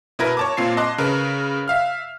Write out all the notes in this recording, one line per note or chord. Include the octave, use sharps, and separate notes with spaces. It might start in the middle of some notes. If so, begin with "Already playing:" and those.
B2 E4 A#4 B4 G#6 A#6
C#5 A5 D6
A#2 C4 F4 C7
D#5 A5 C6 D6 F#6
C#3 A#4 B4
E5 F5 F6